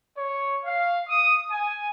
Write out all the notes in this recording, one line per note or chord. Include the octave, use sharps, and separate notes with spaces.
C#5
F5
D#6
G#5